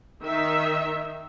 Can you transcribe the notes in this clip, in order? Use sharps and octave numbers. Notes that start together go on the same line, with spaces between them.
D#3 D#4 E5